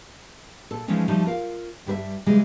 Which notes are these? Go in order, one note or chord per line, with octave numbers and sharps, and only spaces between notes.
A#2 A4
E3 F3 G#3 A3 C#4 D#4
F3 G3 A3 D#4
F4 A#4 F5
G2 G3 B4 E5
C#3 E3 G3 G#3